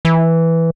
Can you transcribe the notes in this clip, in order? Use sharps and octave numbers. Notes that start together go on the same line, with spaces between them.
E3